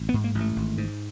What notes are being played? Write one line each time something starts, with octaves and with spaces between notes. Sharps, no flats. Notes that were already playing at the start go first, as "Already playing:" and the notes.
Already playing: A1
B3
G#2
A#3
A1
A3
G#1
G#2